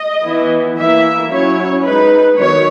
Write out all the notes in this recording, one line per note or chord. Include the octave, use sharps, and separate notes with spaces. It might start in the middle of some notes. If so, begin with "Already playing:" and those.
Already playing: D#5
E3 B3 E4
E3 A#3 E4 E5
F#3 C#4 E4 C#5
G#3 D#4 B4
D#3 F#3 B3 C#5